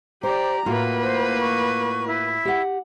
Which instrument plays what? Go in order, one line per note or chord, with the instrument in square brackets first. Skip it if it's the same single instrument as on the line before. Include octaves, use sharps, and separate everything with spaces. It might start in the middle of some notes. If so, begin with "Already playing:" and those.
[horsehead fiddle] G4 D5 [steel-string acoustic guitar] C5 [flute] A#5
[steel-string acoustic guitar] A2 F4 F#4 [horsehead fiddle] A#3 B4
[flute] C5
C#6
E4
[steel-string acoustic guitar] G4 F#5